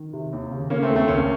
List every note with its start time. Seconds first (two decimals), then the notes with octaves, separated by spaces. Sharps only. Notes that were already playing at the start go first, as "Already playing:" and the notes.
Already playing: D#3
0.13 C3
0.32 D#2
0.51 C#3
0.70 C#3 A#3 C#4
0.83 A3 C4
0.89 D#2
0.96 A3 C4
1.08 C#2 A#3 C#4